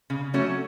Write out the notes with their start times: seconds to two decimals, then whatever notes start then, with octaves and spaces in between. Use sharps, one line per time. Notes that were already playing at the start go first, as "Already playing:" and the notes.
0.10 C#3
0.34 F#3 A3 C#4 F#4